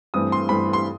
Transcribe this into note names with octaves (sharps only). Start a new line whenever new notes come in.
G2 E3 A3 C4 D#6
C6
G2 E3 A3 C4 B5
C6